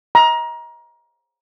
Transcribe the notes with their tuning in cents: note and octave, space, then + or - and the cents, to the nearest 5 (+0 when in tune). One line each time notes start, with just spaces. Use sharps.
A#5 +25